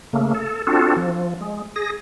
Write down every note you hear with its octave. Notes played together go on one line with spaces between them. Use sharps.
C#3 A3 A#3
A4
C4 D4 F4 F#4 A4
F3
G#3
G#4 A#6